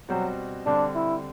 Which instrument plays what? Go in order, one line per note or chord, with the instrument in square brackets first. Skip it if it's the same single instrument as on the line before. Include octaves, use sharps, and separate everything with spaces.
[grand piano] B2 G3 C4 F#4 C5 [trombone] F#3
[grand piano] D3 G3 C4 [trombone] D4
[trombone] E4